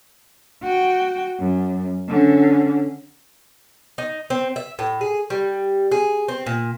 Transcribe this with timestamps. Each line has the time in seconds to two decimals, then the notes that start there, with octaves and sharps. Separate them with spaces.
0.63 F#4 G5
1.40 F#2
2.09 D3 C#4
3.98 D#4
4.30 C4
4.56 E5
4.79 A2
5.01 G#4
5.30 G3
5.91 G#4
6.28 C4
6.46 A#2